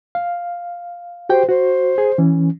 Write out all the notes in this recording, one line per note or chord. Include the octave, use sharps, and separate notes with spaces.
F5
F#4 G4 C5 G5
F#4 C5
G#4
E3 C#4